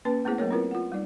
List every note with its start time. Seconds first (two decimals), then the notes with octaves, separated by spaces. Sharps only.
0.05 A#3 C#4 B4 A5
0.25 A3 B3 E4 G#4 C5 F#5
0.38 F#3 A3 A#3 G#4 A#4 C#5
0.50 C4 E4 F4 A#4 B4
0.71 F4 F#5
0.92 G3 D#4 D5